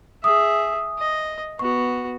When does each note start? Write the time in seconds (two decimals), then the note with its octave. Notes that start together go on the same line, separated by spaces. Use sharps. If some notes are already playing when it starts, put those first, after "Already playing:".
0.24 G#4 E5 D#6
0.99 D#5
1.59 B3 F#4 C#6